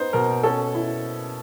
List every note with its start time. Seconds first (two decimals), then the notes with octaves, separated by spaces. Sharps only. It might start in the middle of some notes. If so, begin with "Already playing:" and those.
Already playing: B3 D#4 C5
0.13 B2 A#4
0.43 C#4 A4
0.75 E4